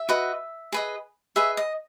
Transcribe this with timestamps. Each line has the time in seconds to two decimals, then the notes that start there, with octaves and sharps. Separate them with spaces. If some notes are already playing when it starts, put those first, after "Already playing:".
Already playing: E5
0.09 F#4 B4 D#5
0.72 G#4 B4 D#5
1.36 G#4 B4 D#5 E5
1.57 D#5